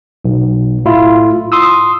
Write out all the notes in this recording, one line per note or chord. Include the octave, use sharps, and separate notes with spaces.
B1
A2 E4 F4
C6 D#6 E6